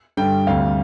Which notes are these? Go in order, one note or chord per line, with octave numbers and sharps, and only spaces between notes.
G2 D3 G3 G5
D2 C3 G3 F5